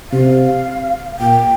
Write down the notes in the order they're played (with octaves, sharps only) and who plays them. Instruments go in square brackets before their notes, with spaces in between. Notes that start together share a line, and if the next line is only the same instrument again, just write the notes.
[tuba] C3 [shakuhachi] F5
[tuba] A#2 [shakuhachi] G5